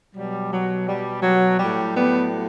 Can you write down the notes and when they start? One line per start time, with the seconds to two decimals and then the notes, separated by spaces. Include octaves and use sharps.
0.15 B2 F#3 G3
0.51 F#3
0.87 G3
1.23 F#3
1.59 A2 F#3 G3
1.95 G3 B3